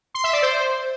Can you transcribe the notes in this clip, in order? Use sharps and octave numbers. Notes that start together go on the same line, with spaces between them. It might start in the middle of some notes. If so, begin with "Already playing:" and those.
C6
E5
D5
C5